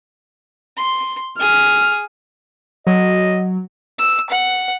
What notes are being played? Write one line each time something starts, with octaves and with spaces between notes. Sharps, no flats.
C6
G#4 F6
F#3 D#5
E6
F#5